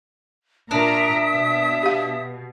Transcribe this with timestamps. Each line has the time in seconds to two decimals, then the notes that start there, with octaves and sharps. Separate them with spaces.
0.71 A#2 D4 A#4 E5 A#5 D#6
1.32 B2
1.83 G4 F5